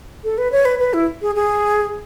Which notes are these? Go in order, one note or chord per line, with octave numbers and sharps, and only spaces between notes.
A4
B4
C#5
B4
B4
E4
G#4
G#4